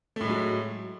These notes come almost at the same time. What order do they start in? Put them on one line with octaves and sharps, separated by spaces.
A3 A2 G#3 F#3